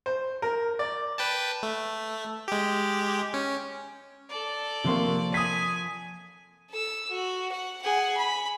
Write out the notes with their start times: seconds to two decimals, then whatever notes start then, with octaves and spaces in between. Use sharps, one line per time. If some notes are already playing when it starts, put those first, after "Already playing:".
0.06 C5
0.42 A#4
0.79 D5
1.18 B4 G5 A5
1.63 A3
2.48 G#3 G4
3.34 C#4
4.30 A4 D5
4.84 C3 F3 A#3 C6 C#6
5.34 G#5 D#6 B6
6.69 A4 E6
7.10 F#4
7.52 F#5
7.82 G#4 F#5
8.17 B5